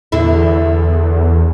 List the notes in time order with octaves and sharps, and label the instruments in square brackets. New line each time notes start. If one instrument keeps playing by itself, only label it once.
[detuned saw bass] E2 [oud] D3 E4